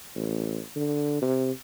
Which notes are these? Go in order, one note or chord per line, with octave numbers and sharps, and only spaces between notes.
A1
D3
C3